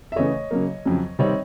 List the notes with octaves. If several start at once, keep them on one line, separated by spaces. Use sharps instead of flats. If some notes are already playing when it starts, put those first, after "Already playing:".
E5
C#3 E3 A3 C#5 D#5
C#3 F#3 A#3
F2 C#3 F#3
C3 D#3 G3 C4 C#5 D#5